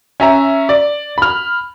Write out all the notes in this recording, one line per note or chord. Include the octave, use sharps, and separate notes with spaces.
C#4 E5 A#5
D5
B5 F6